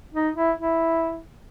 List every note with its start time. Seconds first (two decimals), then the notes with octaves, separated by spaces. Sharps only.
0.14 D#4
0.36 E4
0.58 E4